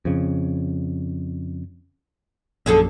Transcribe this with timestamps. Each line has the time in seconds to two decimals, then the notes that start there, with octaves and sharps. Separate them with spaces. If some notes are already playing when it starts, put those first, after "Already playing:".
0.05 F2 C#3
2.66 A#1 F#2 D3 G#4 A4